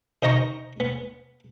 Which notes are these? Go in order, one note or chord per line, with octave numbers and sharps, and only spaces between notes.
D#3 C5 D#5 A#5 C#6
B3